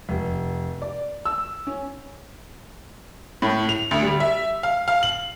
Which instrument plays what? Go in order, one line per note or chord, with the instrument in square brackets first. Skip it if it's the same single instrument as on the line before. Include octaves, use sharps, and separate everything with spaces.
[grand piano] F1
D5
E6
C#4
[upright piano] A2
F7
D2
G3
E5
F5
F5
F#7